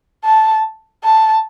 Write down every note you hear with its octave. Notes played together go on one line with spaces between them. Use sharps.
A5
A5